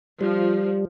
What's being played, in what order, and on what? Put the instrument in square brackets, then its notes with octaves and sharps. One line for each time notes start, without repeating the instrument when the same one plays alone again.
[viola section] F3 [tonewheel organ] G3